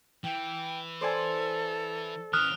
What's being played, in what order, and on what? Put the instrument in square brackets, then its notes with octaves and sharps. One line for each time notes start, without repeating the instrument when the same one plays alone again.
[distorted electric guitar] E3 [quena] G5
[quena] A4 [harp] C5 D5 G#5
[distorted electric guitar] E3 C#4 [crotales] D#6 F6 F#6